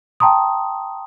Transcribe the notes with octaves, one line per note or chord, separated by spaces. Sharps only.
G5 A5 A#5 C6 D#6